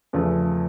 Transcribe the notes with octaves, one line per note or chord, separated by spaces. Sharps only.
E2 C#3 F3 A3